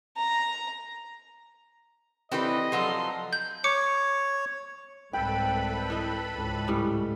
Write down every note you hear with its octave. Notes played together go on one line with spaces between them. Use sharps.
A#5
E3 C4 G4 A4 B4 D#5 G5
F3 F#3 A4 F5 C6
G6
C#5 D6 C#7
C2 G#2 A4 B4 G5 B5
E3 D#5
C#2 G#2
A2 G3 C#4